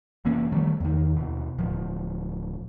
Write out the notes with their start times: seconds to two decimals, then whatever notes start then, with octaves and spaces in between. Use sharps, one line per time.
0.25 F1 E3 A#3 C#4
0.52 D#3 F3 G3 A3
0.80 E2 D#3
1.16 D#2 B2
1.59 D1 F3